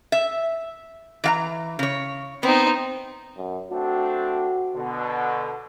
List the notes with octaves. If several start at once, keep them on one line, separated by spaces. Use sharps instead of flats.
E5
E3 F5 A#5
C#3 C#5
B3 C4 D#4
F#2
A3 C4 D4 F#4
B2 D3